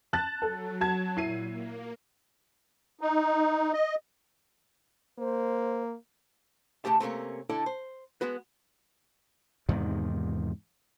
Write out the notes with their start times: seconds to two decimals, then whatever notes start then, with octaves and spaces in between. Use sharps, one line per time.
0.13 A5 F#6 A6
0.42 F#3 A4
0.81 F#4 A5 G#6
1.17 A#2 E4 C7 D#7
1.48 A#3
3.01 D#4
3.73 D#5
5.19 A#3 C5
6.85 C#3 A3 G4 A5
7.00 C3 A3 A#3 C#4
7.50 D3 E4 A4 D5
7.66 C5
8.21 G#3 B3 F#4 B4
9.69 E2 G#2 C3 D#3